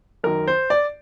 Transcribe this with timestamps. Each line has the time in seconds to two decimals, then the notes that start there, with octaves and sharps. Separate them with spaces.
0.24 F#2 D#3 A#4
0.48 C5
0.70 D5